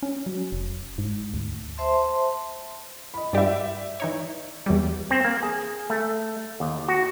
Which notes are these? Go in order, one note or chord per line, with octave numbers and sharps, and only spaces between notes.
C#4
F#3
F1
G#2
D2
C5 E5 A5 C6
D#5 B5
G2 G4 D5 E5
E3 D#4 C#5
E2 F#3 G3
C4
A#3
G#4
A3
D#2
F#4